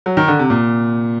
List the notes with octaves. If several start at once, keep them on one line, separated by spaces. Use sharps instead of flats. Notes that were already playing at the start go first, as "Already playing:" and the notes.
F#3
D#3
D3
C3
A#2